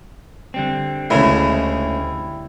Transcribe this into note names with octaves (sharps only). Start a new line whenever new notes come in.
D3 G3 C4
D2 C#3 G#3 E4